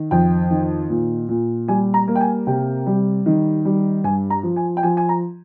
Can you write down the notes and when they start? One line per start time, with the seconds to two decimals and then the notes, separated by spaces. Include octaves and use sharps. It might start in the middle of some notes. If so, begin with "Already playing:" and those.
Already playing: D#3
0.11 F2 G5
0.51 D#3
0.90 A#2
1.29 A#2
1.68 G3 G#5
1.94 A#5
2.08 A#3
2.15 G5
2.21 G#5
2.47 C3 G5
2.86 G3
3.26 D#3
3.65 G3
4.04 G2 G#5
4.30 A#5
4.43 F3
4.56 G#5
4.77 G5
4.83 F3 G#5
4.97 G#5
5.09 A#5